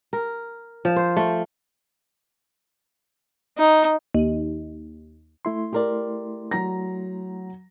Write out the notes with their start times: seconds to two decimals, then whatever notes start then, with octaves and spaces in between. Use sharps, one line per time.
0.13 A#4
0.85 F3
0.96 C5
1.17 A3
3.58 D#4
4.14 D#2
5.45 A3 E4 C6
5.72 G4 A#4 D5
6.51 F#3 A#5 A#6